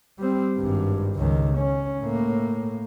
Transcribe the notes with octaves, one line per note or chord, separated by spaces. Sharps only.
G3 C4
G#1 G2
C#2 D#3
C#4
A2 A#3